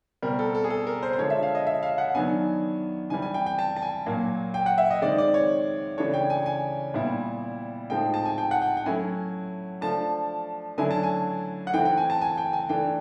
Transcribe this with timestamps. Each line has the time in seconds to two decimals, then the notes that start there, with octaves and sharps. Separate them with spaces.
0.23 B2 G3 C4 A#4
0.39 A4
0.55 A4
0.64 G#4
0.70 A4
0.87 A#4
1.03 C5
1.13 C5
1.18 D3 F3 G#3 C#5
1.30 E5
1.43 F5
1.55 D#5
1.67 E5
1.83 F5
1.98 F#5
2.15 D#3 F#3 B3 D4 G#5
3.10 C3 E3 G3 G#5
3.22 G#5
3.34 G5
3.46 G5
3.59 A5
3.76 A5
3.82 G#5
4.06 A#2 F#3 A#3
4.54 G5
4.66 F#5
4.78 E5
4.90 D#5
5.02 D#3 G#3 C4 D5
5.18 D5
5.34 C#5
5.98 C#3 E3 A3 D4 C#5
6.14 G5
6.30 G#5
6.46 G#5
6.94 A#2 G3 B3 E4
7.90 A2 F3 G#3 C4 D#4 G5
8.14 A5
8.25 G#5
8.38 G5
8.51 F#5
8.61 G5
8.77 G5
8.86 F#3 A3 C#4 E4 G#5
9.81 F3 A3 D4 A5
10.78 D3 F#3 A3 C#4 E4 G#5
10.91 A5
11.03 G#5
11.67 F#5
11.74 E3 A3 C4 E4 G5
11.85 G5
11.97 G#5
12.10 A5
12.21 G#5
12.38 G5
12.53 G#5
12.69 E3 A3 D4 G5